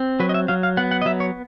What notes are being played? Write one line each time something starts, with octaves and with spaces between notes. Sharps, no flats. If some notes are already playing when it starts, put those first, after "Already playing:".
Already playing: C4
F#3 B4
D#5
E5
F#3 F5
F5
B3 F#5
F#5
D#5
F#3 E5
C#5